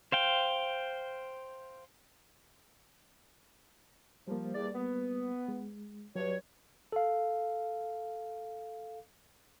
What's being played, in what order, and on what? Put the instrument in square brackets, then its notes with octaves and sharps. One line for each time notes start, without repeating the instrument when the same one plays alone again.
[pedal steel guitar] C5 F5 G5
[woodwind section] F3 [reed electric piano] G3 A#3
[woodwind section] E2 D5
B3
[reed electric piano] G#3
[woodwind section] G2 C#5 [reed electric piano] F#3
[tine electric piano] A4 F5